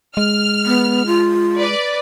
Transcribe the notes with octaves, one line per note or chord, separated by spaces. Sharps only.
G#3 F6
B3
F4
B4 D5